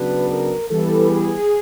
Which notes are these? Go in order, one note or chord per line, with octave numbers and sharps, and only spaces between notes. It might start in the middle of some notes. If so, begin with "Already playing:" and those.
Already playing: C#3 F#3 B3 D4 B4
A#4
E3 G3 B3 A4
G#4